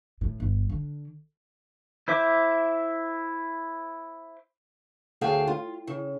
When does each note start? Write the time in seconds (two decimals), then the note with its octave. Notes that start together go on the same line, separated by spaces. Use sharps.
0.21 A2
0.40 G1
0.70 D3
2.08 E4 C5 E5 D6
5.21 D2 G#4 F5 G5 A5
5.47 F4
5.87 C#3